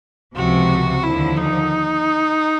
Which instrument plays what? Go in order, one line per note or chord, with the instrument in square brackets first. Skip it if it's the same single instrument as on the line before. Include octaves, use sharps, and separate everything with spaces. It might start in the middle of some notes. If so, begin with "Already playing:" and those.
[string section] C#2 C3 F3 [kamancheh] F#4
[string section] D#2 D3 F3 [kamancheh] E4
[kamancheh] D#4